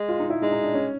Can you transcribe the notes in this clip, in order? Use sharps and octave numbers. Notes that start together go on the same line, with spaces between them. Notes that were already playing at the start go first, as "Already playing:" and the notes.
Already playing: G#3
F4
D#4
E4
G#3 D#4
D#4
D4
C#4